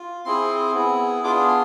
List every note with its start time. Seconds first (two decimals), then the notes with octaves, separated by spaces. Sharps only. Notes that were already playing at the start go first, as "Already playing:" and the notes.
Already playing: F4
0.25 C4 E4 G#4 C6
0.74 B3 E4 G#4
1.24 B3 D4 F4 G#4 D6
1.48 C6